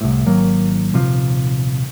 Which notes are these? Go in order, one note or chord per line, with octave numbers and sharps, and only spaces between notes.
C2 A2
G#1 D#3 F#3 A#3
D#1 C3 F3